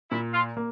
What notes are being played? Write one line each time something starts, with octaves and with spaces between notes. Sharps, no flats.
A#2 E4
F4
A#3